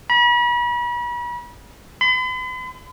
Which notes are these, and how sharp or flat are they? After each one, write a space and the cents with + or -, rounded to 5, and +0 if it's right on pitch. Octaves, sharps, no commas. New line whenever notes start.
B5 -40
B5 +45